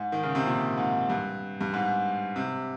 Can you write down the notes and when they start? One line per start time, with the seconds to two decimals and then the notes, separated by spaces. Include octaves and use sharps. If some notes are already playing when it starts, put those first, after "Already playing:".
Already playing: G#2
0.12 D#3
0.23 C#3
0.35 C3
0.46 A#2
0.77 G#2
1.10 G2
1.61 G2
1.73 G#2
2.36 C3